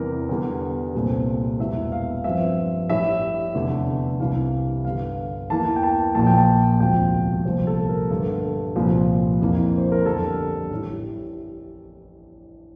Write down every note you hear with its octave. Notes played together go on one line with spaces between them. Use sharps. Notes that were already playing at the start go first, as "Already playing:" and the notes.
Already playing: E2 C3 E3 G3 A#4
E2 D3 G3
C2 A#2 A3 C4
E1 E2 E3 E5
F5
G2 F3 C4 E5
A1 A2 G3 E5
F1 E2 D3 A3
C2 C3 E3 F5
G1 G2 D3 F5
E2 E3 A#3 A5
G5
A5
A#1 A#2 F3 A5
G5
A5
E1 D2 C3 F3 G5
C2 A#2 F3 C5
A4
A#4
G2 D3 A3 A4
C2 A#2 F3 C4
F2 E3 A#3
C5
A#4
G1 F2 D3 G3 A4
A1 A2 E3 G3